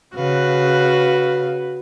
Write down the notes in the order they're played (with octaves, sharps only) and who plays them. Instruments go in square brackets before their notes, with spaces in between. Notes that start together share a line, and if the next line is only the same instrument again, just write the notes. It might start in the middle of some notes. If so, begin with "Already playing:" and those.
[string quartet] C#3 F5 [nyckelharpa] F#4 B4